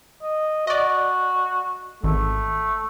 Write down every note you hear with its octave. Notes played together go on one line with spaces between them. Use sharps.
D#5
F#4 D5 D#5
G#1 A3